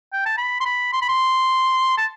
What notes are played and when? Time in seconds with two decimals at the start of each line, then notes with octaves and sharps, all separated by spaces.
0.13 G5
0.25 A5
0.38 B5
0.61 C6
0.65 B5
0.93 C6
1.02 B5
1.09 C6
1.98 A5